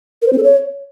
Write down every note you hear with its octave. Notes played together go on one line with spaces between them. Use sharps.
A#4
C5
C4
A4
C#5